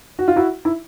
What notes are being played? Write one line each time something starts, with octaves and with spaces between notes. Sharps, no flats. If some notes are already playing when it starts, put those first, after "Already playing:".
F#4
F4
E4 F#4
E4